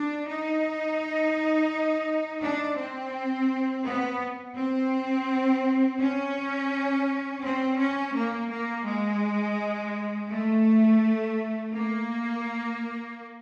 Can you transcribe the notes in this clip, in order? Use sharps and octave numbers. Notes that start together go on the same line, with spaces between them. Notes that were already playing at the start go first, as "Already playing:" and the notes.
Already playing: D4
D#4
D4
C4
B3
C4
C#4
C4
C#4
A#3
A#3
G#3
A3
A#3